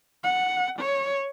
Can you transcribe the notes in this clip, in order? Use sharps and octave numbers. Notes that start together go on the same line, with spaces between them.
F#5
C#5